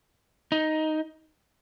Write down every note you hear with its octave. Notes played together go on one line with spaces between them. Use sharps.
D#4